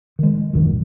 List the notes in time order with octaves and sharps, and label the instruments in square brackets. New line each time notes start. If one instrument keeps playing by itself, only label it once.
[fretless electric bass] D#3 G#3
D#1 A#1 F#2 D#3